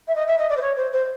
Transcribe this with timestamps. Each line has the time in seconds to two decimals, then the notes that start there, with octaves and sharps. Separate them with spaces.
0.07 E5
0.15 D#5
0.27 E5
0.38 D#5
0.49 D5
0.57 C5
0.61 C#5
0.76 C5
0.92 C5